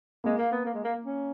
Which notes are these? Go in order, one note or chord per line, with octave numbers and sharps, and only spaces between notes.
G#3 A#3
A#3
B3
A#3
G#3
A#3
C#4